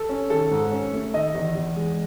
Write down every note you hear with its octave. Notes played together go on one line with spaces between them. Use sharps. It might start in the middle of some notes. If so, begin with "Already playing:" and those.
Already playing: A4
C#4
D#3 A4
G#2
C#4
A3
D#3 D#5
E2
E2
G#3